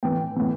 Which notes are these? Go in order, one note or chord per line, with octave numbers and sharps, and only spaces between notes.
A2 E3 G5
A2 E3